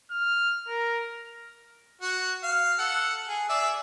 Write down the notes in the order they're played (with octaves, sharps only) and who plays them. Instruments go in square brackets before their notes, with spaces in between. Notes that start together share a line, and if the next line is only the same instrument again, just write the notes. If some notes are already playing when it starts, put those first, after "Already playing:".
[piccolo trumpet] F6
A#4
[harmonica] F#4
F5
A4 F#5
G#4
G#4 D5 E5